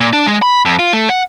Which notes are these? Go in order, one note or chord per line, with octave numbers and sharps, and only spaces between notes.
A#2
D4
G#3
B5
F2
F4
A3
F#5